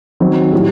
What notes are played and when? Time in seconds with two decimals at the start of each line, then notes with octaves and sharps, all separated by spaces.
0.20 D#3 F#3 C4 D#4
0.53 A2 G3 D#4